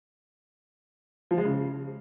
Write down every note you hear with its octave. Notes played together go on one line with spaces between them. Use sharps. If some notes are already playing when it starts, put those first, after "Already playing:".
F3
G#3
C#3